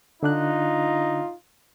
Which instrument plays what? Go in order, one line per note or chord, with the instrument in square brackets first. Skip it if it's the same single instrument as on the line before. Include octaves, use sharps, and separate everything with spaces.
[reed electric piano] D3 D4 F#6 [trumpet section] D#4 F4